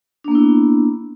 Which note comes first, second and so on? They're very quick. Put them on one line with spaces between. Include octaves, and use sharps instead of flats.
D4 A#3 B3 E4